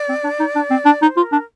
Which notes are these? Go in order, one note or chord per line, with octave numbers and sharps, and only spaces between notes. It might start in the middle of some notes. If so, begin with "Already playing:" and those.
Already playing: D5
C4
D4
D#4
D4
C4
D4
D#4 D5
C5
F4
A#4
D4